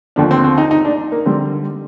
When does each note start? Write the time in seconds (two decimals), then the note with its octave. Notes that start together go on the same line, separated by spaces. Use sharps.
0.16 D#2 D3 F3 D4
0.31 C4
0.44 C4
0.58 D#4
0.71 D#4
0.85 D4
1.12 A#3
1.26 D3 G3 C4